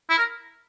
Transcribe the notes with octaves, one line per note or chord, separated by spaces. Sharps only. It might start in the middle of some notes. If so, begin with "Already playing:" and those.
E4
A#4